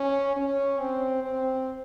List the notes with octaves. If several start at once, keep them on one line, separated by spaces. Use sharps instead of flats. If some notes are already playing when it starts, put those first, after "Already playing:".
Already playing: C#4
C#4
C4
C4